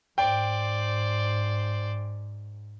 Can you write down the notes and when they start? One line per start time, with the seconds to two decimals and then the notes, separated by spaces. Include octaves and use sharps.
0.18 G#2 C5 D5 G5